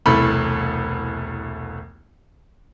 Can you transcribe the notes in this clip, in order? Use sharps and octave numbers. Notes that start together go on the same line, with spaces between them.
E1 C2 E3 A3 B5